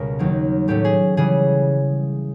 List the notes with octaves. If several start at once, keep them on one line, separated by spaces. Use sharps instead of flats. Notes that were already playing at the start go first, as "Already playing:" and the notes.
Already playing: C#2 B2 G3 A#4
D#2 D#3 F#3 A#3
A2 F#3 A3 C#4 G4
G#4
C#3 E3 G3 G#4